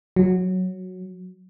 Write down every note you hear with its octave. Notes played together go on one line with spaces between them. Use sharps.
F#3